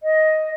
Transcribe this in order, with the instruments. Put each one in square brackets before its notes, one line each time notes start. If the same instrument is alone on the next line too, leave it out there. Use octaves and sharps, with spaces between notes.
[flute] D#5